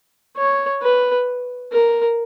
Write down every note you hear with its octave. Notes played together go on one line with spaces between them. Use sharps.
C#5
B4
A#4